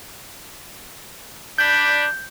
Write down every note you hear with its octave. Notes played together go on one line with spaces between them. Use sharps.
D4 D5 B5 G6